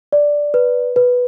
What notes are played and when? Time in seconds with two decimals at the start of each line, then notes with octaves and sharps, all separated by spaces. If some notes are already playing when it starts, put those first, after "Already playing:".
0.13 D5
0.54 B4
0.96 B4